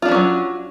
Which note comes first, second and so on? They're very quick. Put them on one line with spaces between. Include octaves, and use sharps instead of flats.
F4 D4 E3 C#4 F#3